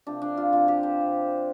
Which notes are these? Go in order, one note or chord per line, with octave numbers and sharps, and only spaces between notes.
C3 F3 C4 D4
D4
F4
C3 F3 C4 F4
G4
C5
C3 F3 C4